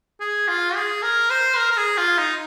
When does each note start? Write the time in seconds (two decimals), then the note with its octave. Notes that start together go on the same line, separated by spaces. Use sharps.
0.20 G#4
0.48 F4
0.75 G#4
1.03 A#4
1.30 C5
1.57 A#4
1.72 A#4
1.77 G#4
1.98 F4
2.18 D#4